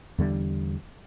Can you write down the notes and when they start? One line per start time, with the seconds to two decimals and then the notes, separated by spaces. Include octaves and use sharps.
0.18 E2 D3 G3